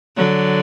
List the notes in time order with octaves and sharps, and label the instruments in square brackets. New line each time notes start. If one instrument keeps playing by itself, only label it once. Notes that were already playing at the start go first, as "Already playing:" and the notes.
[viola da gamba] D3 F#3